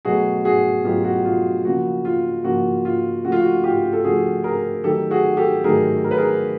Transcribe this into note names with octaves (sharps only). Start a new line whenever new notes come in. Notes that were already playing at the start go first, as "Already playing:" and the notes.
B2 F#3 A3 F#4 G#4
F#4 G#4
B2 F#3 A3 F4 G4
F#4
F4
C#3 F3 A#3 F#4
F4
C#3 F3 A#3 F#4
F4
C#3 F3 A3 F#4
F4
F#4
F4 G4
A4
C#3 F3 A3 F#4 G#4
G#4 A#4
D#3 F#3 A3 G4 A4
F#4 G#4
G4 A4
D#3 F#3 A3 G#4 A#4
A#4
B4
G#4 A#4